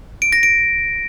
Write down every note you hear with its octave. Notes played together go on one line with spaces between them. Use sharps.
D7
A#6
D7